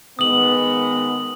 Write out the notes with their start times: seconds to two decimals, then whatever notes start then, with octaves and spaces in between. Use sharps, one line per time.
0.19 D#3 G#3 B3 D#6 F#7